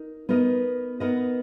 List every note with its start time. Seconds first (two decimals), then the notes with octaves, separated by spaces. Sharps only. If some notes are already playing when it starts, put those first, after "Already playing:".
Already playing: D#4 A#4
0.29 B3 D#4 A#4 D#5
1.00 B3 D#4 A#4 D#5